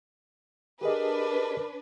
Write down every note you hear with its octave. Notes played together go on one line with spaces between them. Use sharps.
D4 G4 G#4 A#4 B4 D#5